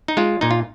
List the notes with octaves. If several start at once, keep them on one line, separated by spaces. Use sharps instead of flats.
D#4
G#3 F4
A#2 D#4
F4